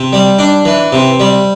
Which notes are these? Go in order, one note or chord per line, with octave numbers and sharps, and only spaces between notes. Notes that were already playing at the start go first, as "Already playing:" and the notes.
Already playing: C3
G3
D4
E3
C3
G3